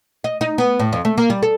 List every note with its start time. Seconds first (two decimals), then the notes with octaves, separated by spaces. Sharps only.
0.24 D#5
0.41 D#4
0.58 B3
0.79 A2
0.93 F2
1.05 A3
1.18 A#3
1.30 G3
1.43 A4